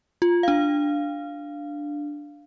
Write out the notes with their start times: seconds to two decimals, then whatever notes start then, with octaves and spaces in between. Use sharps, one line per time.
0.22 F4
0.43 D4 F5